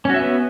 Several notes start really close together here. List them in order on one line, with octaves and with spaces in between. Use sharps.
C#4 F#4 E5 B3